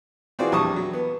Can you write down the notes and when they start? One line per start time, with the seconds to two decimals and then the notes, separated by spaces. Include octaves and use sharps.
0.39 E3 C4 F4 F#4 G#4 D5
0.52 A#1 E2 G3 A5 C#6 D#6
0.76 F#3
0.93 B3